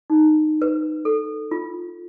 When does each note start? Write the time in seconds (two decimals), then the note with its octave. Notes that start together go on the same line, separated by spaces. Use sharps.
0.10 D#4
0.62 B4
1.05 A4
1.51 F4